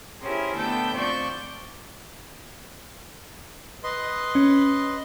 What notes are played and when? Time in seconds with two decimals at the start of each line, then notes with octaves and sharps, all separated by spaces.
0.21 C#4 E4 G4 G#4 A#4 C5
0.55 D3 A3 B3 A4 G5 G6
0.95 F2 C5 D5 C#6 G6
3.84 B4 D#5 C6
4.35 C#4